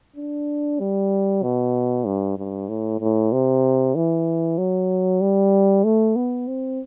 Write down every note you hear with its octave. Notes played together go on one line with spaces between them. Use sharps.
D4
G3
B2
G2
G2
A2
A2
C3
E3
F#3
G3
A3
B3
C4